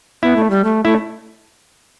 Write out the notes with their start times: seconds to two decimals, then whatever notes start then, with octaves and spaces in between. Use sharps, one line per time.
0.23 B3 E4
0.36 A3
0.50 G3
0.64 A3
0.85 A3 E4